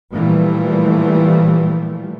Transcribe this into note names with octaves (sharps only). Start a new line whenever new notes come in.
A#2 E3 F3 G3 A3